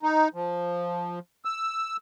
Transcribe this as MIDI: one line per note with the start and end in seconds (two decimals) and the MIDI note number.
0.03 0.28 63
0.34 1.19 53
1.45 1.97 88